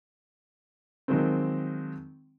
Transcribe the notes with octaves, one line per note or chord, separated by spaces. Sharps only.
D#3 F3 F#3 G#3 C4